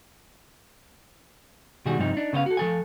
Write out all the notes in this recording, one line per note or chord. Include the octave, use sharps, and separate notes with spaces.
B2 D#3 G3 F#4 G#4
G2 C3 F3 D#4
D4 D#4
C#3 B3 C5 F5
F#4 A4
F3 A4 G#5